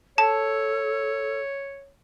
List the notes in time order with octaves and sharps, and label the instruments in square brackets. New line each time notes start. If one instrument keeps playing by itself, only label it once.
[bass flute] A4 [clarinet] C#5 [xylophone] A5